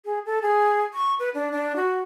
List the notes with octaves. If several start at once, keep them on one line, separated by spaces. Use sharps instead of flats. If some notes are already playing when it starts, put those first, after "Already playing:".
G#4
A4
G#4
C#6
B4
D4
D4
F#4